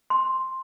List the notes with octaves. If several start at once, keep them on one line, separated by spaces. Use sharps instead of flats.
C6